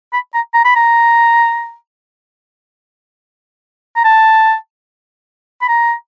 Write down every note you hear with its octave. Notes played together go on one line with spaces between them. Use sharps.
B5
A#5
A#5
B5
A#5
A#5
A5
B5
A#5